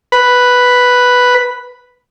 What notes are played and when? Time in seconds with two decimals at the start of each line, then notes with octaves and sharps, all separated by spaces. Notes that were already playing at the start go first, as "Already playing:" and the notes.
0.12 B4 B5